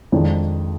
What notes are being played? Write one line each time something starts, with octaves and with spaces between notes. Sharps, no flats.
F2 D#3 G#3 D4 G#4